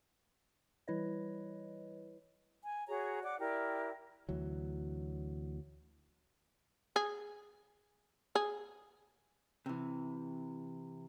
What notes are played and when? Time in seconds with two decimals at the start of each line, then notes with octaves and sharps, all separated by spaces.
0.88 E3 G3 E4 B4 C#5 D#5
2.64 G#5
2.87 F#4 G#4 C#5 A#5
3.23 D5 F#5 D6
3.40 E4 G4 A#4 D5
4.29 D2 E3 F#3
6.96 G#4
8.35 G#4
9.66 C3 E3